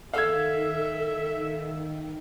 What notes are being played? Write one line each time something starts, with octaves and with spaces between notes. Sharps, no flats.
D#3 A4 E5 F5 E6 G#6